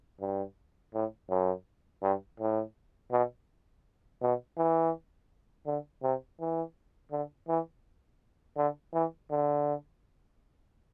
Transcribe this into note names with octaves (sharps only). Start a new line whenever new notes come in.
G2
A2
F#2
G2
A2
B2
B2
E3
D3
C3
E3
D3
E3
D3
E3
D3